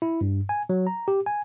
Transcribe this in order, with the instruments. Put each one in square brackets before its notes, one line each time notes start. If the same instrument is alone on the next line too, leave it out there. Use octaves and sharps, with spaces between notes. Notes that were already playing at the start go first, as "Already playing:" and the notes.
[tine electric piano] E4
G2
G#5
F#3
A#5
G4
G#5